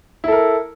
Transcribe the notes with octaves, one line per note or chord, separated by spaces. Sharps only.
E4 A4 A#4